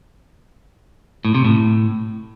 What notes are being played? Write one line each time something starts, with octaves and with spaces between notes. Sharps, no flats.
A2
C3
A2